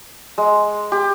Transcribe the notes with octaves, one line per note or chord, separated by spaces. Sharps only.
G#3
G4